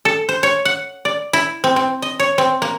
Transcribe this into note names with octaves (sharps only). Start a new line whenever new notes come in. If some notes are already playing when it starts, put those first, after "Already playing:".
A4
C5
C#5
F#5
D5
E4
C4
C4
D#5
C#5
C4
A#3